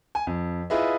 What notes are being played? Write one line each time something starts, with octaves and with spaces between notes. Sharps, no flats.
G#5
F2
E4 F4 G#4 B4 D#5 E5